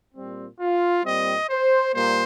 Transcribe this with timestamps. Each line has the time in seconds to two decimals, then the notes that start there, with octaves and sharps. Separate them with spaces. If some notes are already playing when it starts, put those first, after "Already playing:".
0.15 A#2 G3 C4
0.60 F4
1.05 A#2 G3 C4 D#5
1.50 C5
1.94 A#2 G3 A#3 C5